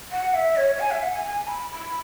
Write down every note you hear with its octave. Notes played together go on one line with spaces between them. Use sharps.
F#5
E5
C#5
G#5
E5
F#5
G#5
G#5
B5
B5